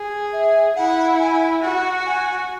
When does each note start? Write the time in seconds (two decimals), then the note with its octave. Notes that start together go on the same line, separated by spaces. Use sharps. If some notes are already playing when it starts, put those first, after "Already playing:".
Already playing: G#4
0.33 E5
0.76 E4 F#5
1.19 G#5
1.63 F#4 F#5
2.06 G#5